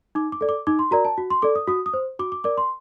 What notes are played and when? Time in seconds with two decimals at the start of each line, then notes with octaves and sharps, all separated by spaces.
0.15 D#4 D6
0.32 D6
0.41 A4 D5
0.49 D6
0.67 D#4 D6
0.79 C6
0.91 F#4 A#4 D5 A#5
1.05 A5
1.18 F#4
1.30 C6
1.42 A4 D5 D6
1.55 D#6
1.67 F#4 D#6
1.86 D#6
1.94 C5
2.19 F#4 D6
2.32 D6
2.44 A#4 D5 D6
2.57 C6